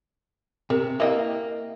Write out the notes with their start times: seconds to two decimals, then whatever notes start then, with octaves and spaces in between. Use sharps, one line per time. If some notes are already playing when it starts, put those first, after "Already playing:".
0.70 C3 A#4
1.00 A#3 E4 D#5 G5